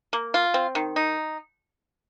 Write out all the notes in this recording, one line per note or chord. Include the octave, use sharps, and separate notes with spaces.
A#3
F4
C4
D#3
D#4